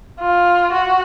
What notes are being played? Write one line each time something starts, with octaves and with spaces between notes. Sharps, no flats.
F4
F#4